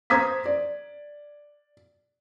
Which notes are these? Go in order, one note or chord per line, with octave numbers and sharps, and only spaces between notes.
C5 A#5 D#6 G#6 B6
D5